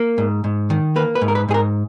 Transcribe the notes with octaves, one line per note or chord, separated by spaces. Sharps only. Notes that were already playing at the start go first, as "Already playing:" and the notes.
Already playing: A#3
G#2
G#2
D#3
A#3 B4
B4
G#2
A#4
B4
G#2 G#4
A#4